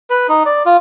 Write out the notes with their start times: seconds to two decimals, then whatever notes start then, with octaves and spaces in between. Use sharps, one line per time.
0.10 B4
0.29 D#4
0.46 D5
0.66 F4